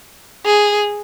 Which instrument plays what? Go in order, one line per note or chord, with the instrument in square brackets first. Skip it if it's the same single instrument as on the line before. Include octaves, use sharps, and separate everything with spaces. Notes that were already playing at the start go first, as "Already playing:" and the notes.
[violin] G#4